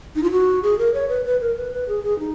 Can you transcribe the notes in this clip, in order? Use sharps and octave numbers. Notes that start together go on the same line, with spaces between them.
D#4
F4
F#4
G#4
A#4
C#5
B4
B4
A#4
B4
B4
G#4
G#4
D#4